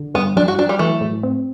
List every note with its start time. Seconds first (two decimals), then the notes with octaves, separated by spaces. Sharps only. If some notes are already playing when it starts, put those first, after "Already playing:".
Already playing: D3
0.14 G2 B3
0.37 F#3 D4
0.48 F#4
0.59 F#3 D4
0.69 G3
0.79 E3 A3
1.01 A2
1.23 C4